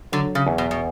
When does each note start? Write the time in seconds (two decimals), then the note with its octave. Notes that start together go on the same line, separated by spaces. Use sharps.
0.12 D3 F#3
0.35 C#3
0.47 E2
0.58 B2
0.71 B2